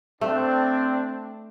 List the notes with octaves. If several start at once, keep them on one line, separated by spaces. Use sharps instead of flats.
A3 C4 D4